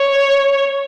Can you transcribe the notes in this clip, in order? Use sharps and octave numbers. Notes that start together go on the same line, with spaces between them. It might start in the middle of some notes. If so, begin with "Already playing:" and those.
Already playing: C#5